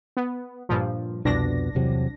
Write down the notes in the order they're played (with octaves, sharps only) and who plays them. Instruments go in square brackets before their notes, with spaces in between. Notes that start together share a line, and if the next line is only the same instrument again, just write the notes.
[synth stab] B3
G2 A#2 F3
[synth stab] C2 D4 A#6 [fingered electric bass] F2 B2
[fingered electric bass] E2 C3 F#3